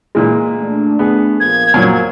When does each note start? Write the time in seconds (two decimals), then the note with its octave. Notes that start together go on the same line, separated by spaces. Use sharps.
0.15 A#2 E3 G#3
0.58 A3 D4
0.99 B3 G#4
1.40 A#1 F3 A#3 G#6
1.74 F#2 A#2 F#3